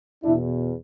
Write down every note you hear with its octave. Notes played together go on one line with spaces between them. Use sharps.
E2 B2 D4 E4